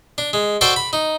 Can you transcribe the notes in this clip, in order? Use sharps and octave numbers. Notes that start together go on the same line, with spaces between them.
D4
G#3
F#4 A4 C5 D5 G5 A5
B5
D#4